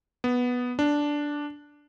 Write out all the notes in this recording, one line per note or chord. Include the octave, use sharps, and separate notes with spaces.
B3
D4